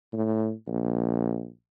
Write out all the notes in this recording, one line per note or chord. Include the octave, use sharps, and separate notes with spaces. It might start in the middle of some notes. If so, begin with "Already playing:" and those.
A2
A#1